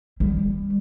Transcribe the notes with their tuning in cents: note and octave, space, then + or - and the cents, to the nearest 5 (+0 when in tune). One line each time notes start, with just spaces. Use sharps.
G3 +35